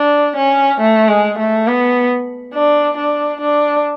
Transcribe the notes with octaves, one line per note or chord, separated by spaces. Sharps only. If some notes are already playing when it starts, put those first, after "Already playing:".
Already playing: D4
C#4
A3
G#3
A3
B3
D4
D4
D4